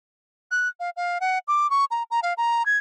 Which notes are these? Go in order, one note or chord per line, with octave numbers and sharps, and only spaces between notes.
F#6
F5
F5
F#5
D6
C#6
A#5
A#5
F5
A#5
G#6